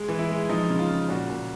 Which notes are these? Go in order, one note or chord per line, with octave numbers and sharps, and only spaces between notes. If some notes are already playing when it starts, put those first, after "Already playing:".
Already playing: G#3
E3
E4
G#3
F3 D#4
C#3
F4
C#3
A#2 F#4
A#2